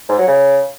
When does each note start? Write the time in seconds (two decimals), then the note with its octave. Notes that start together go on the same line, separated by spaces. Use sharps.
0.09 G#2
0.18 F#3
0.28 C#3